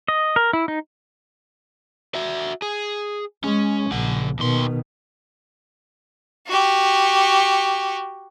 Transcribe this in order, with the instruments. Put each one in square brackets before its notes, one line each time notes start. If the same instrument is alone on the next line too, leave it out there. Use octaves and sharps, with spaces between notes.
[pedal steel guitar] D#5
A#4
E4
D#4
[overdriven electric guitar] F#4 E5
G#4
[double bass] G#3 [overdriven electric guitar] C#4
[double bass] A#1 [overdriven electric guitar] C#3 F#5
[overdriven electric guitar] D#2 C6 [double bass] B2 D#3
[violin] F#4 G4